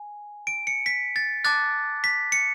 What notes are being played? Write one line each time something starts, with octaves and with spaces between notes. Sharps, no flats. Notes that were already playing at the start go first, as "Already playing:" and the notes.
Already playing: G#5
D7
C#7
B6
A6
A5 D6 F#6 A6
B6
C#7